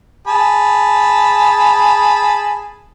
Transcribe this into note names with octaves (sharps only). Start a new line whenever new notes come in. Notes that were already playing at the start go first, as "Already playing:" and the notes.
G#4 A5 B5